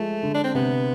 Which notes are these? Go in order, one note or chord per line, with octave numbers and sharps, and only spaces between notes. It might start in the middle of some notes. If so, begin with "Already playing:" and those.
Already playing: F3 G#3 A3
D3
D4
C4
C3 B3